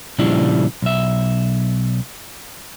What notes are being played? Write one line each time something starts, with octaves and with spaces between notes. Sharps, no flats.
A#2 C#3 F3 G3 D4 E4
B1 E5